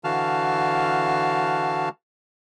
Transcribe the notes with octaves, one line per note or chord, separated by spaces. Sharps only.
D3 E3 F#4 F5 A5 F6